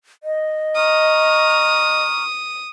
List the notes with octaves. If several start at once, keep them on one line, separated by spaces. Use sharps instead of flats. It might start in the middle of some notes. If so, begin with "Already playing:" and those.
D#5
A#5 C#6 D#6 F6